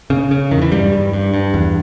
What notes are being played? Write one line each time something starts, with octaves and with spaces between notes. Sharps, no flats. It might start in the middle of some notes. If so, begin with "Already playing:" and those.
C#3
C#3
E2 D#3
E3
G2 G3
G2
G2
G2
E2